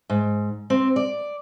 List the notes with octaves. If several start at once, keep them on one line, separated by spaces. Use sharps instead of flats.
G#2
C4
D5